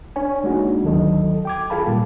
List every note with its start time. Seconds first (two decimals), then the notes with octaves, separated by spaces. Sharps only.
0.16 D4 C#5 G#5
0.44 G#3 A#3 D4 D#4 F#4
0.84 D2 D#3 F#3 A4 D#5
1.45 G5 D6 G#6
1.70 F4 G#4 A4 F5 A5 B5
1.87 A#2 G3 A#3